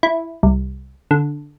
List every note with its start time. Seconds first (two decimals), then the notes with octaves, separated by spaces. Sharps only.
0.03 E4
0.43 C2
1.11 D3